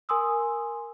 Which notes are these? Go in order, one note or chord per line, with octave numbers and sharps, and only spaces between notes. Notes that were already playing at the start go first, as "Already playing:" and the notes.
A#4 G#5 C6 D#6 E6